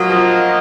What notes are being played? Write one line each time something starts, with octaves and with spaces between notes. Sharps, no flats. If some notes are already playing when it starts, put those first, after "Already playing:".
Already playing: F#3 A#3 F4 A#4 D#5 F#5
F3